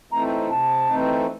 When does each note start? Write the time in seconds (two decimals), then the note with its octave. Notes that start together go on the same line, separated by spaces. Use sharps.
0.11 E3 A3 C4 D#4 A#5
0.50 C3 A5
0.88 E3 A3 C4 D#4